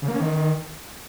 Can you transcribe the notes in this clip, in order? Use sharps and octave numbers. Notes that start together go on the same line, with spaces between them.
C#3
A#3
C#4
D#3